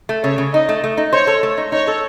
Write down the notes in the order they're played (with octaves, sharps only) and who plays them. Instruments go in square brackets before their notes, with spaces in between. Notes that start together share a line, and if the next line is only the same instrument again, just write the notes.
[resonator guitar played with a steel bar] A3
[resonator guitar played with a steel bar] C#3 [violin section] C#5
[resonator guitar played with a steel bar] C#3
[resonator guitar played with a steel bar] D#4 [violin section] D#5
[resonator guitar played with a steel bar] A3
A3
D#4
[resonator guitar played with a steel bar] C5 [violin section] C#5
[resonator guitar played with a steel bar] A4
A3
D#4
[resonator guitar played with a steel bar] D#4 [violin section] C#5
[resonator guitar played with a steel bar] A4